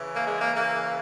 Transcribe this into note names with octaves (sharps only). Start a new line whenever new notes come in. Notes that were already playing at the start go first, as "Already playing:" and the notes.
Already playing: C#3 E3
A#3
G#3
A#3
A#3